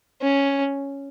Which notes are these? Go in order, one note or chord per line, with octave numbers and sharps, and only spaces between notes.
C#4